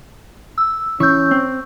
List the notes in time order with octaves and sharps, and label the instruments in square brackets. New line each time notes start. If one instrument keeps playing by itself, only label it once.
[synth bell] E6
[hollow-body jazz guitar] E3 [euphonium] C#4 [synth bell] C#6 E6 G6
[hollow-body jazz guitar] C4